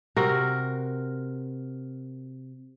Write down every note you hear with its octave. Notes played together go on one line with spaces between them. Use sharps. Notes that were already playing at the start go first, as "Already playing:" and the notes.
C3 F#4 A#4